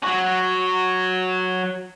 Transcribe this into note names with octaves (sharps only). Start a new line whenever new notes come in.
F#3 F#4